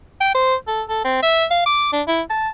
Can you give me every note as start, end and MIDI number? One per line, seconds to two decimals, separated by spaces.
0.21 0.34 79
0.35 0.55 72
0.68 0.82 69
0.89 1.03 69
1.04 1.22 60
1.23 1.45 76
1.50 1.63 77
1.66 1.88 86
1.92 2.02 62
2.08 2.22 64
2.30 2.49 81